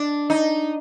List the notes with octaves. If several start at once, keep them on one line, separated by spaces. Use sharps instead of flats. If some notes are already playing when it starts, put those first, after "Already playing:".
Already playing: D4
D#4